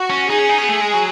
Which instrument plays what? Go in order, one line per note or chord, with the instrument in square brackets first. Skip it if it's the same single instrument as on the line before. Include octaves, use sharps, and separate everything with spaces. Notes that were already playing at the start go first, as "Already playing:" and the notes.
Already playing: [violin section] F#4
[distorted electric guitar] C#4
[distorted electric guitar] D#4 [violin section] G#4
[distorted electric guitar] C#4
D#4
C#4
B3
A3
G#3
F#3